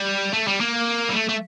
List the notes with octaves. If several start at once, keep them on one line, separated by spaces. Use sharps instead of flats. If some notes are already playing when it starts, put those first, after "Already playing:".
Already playing: G3
A3
G3
A#3
G3
A3
A3